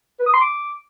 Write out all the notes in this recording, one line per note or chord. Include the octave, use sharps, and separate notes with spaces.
B4
D#6
C6
D6